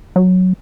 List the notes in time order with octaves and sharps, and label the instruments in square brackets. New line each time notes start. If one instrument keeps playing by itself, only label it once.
[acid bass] F#3